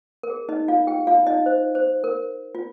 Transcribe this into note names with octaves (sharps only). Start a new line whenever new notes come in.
A#4
G#4
D#4 D#5
F4 F5
G4 G5
F4 F5
D#4 D#5
C5
C5
A#4
F4